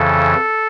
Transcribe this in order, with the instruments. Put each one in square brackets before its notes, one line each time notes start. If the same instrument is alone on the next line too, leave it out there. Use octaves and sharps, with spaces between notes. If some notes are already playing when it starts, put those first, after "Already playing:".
Already playing: [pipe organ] F2 C#3 E3 A4